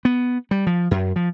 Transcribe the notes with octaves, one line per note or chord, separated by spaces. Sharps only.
B3
G3
F3
F#2
F3